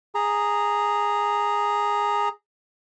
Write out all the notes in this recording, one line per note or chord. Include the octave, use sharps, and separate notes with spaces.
G#4 A#5